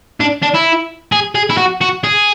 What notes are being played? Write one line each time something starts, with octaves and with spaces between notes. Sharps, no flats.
D4
D4
E4
G#4
G#4
E4
F#4
F#4
G#4